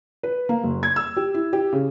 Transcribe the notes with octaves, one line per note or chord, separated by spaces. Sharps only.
B4
A#3
F#1
G#6
E6
G4
E4
G4
C#3